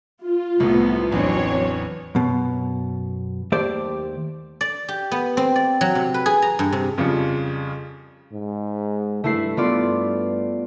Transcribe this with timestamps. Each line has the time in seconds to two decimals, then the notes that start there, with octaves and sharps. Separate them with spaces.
0.22 F4
0.60 C2 A2 C3 B3
1.12 A1 E2 F#3 C4 D4 C#5
2.15 F#2 B2
3.52 D#2 A3 G4 C5 D5
4.61 D5
4.88 G4
5.12 B3
5.37 C4
5.56 D5
5.81 F#3
5.95 C3
6.14 B4
6.26 G#4
6.42 A#5
6.59 G2
6.72 C3
6.98 F2 C#3 F3 G3 F4 C#7
8.33 G#2
9.24 G2 A3 E4 C7
9.57 G2 B3 F4 D5